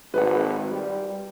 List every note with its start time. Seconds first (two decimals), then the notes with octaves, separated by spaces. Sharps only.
0.14 G#1 B4 E5 F#5
0.71 G3